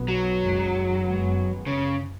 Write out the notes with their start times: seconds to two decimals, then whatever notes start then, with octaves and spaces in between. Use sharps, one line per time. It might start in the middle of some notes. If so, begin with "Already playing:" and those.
Already playing: B1 B2 B3
0.08 F#3
0.41 F#1 F#2 D#3 G#3
1.04 F#1 F#2 D#3 G#3 B3
1.67 C#3